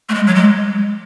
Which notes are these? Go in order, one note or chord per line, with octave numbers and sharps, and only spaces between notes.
A3
G#3
F#3
G#3